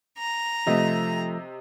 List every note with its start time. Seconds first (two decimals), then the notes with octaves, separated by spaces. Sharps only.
0.18 A#5
0.67 C3 F3 A3 D#5